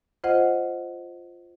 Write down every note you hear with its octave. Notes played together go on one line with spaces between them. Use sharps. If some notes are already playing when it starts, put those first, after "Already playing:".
F4 C5 D#5 F#5